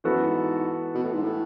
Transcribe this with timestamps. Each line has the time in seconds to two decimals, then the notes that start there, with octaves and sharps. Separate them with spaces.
0.04 F#2 E3 B3 F#4 A4
0.21 F#2
0.27 G#2
0.95 B2
1.04 A2
1.13 G#2
1.22 A2